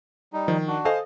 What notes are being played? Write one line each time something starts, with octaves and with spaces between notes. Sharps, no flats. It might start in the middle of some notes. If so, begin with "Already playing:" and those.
G3 D#4
D#3 F3
D4 F#4
A4 C5 D#5 F5 G#5